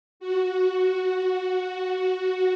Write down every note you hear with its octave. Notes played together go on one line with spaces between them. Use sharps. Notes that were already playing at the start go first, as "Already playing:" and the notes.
F#4
F#4